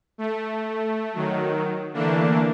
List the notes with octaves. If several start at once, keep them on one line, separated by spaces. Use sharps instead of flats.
A3
D#3 F#3
D3 E3 A3 A#3 D4